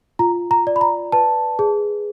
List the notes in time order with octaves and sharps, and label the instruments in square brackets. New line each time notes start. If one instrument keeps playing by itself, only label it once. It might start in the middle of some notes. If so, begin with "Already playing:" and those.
[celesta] F4 A#5
A#5
D5
B5
A#5
B4 A5
G#4